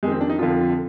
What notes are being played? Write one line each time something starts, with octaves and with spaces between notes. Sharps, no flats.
F2 D#3 G#3
C4
D4
D#4
F2 D3 F3 F4